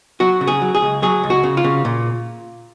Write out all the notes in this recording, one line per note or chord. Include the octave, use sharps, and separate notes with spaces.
F#3 F#4
C#3
G#4
F#3
G#4
C#2
F#3 G#4
C#2
F#4
C#3
F4
C#3
A#2